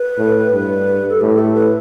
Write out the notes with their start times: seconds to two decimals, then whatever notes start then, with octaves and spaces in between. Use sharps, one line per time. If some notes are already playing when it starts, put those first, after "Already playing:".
Already playing: B4
0.18 A2
0.53 G2
1.10 A4
1.21 A2 G4
1.39 A4
1.55 B4